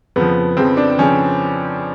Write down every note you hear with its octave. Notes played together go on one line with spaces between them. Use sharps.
F2 C#3 F3 B3
F2 C#3 F3 C4
D4
C#3 F3 C#4